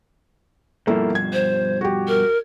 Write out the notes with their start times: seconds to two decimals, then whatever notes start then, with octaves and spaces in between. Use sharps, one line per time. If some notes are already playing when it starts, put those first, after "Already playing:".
0.87 G2 B2 F3 A#3 E4 A4
1.15 G#6
1.33 C5
1.81 F#4 G4
2.08 A#4